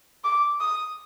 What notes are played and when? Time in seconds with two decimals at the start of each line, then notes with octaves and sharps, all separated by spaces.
0.24 D6
0.61 D#6